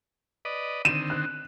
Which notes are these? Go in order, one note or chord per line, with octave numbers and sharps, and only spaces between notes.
B4 D5 D#5
D3 D#3 C4 D#7 E7
F#6